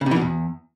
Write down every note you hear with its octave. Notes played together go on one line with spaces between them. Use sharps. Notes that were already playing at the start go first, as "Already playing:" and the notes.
C#3
C3
E3
B2
E2